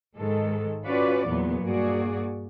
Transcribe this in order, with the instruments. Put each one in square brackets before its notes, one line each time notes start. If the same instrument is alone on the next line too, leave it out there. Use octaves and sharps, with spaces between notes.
[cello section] G#2 D#3 G#3 A4
C#4 F4 F#4 B4 D5
E2 A#2 F#3 B3
G2 A#3 F#4 G#4 D5